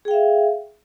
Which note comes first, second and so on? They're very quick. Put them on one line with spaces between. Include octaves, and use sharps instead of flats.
G#4 G5 F5 E5